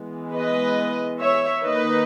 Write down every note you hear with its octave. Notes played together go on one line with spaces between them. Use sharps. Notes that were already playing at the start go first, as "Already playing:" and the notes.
Already playing: E3 G#3 B3
B4 D#5
C#5 E5
D#3 A#3 D#4 B4 D#5